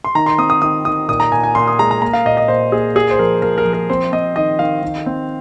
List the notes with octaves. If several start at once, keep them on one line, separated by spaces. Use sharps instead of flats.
C6
D#3 A#5
C6
C4 D#6
D#6
D#3 D#6
D#3 D#6
A#2 D#6
A#5
A#2 G#5
G#5
A#2 C6
D#6
G#3 A#5
A#5
A#3 A#5
F5
A#2 D#5
D#5
A#2 C5
A#3 G#4
A#2 G#4
C5
F3 A#4
F3 A#4
A#4
F3
A#4
C4 C5
C4 D#5
D#3 D#5
D#3 F5
D#3
C4